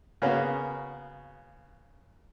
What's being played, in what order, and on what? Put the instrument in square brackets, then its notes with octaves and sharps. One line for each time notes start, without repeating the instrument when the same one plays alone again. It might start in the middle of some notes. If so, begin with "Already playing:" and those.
[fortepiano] C#3 A#3 B3 C#4 F#4